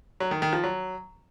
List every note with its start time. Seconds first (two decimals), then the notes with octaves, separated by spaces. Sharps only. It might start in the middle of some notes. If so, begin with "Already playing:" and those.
0.20 F#3
0.31 D#3
0.42 D#3
0.53 F3
0.63 F#3